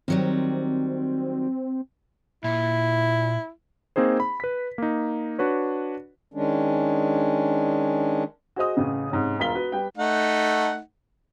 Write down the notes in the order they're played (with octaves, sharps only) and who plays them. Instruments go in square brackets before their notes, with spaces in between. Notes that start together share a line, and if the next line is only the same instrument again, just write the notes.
[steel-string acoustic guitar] D#3 F#3 G3 [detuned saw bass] C4
[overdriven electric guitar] A#2 [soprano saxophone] E4
[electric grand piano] A#3 C4 D#4 G#4 C5
B5
B4 B6
A#3 D#4
D4 F#4 B4 C#5
[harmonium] D#3 G#3 C#4 D4
[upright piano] F#4 G#4 C5 D#5 D#6
A1 C#3
G#2 C3 C#4
E1 F4 A#4 B6 G7
F#4 B4
G3 B4 G5
[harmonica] A3 D#4 F#5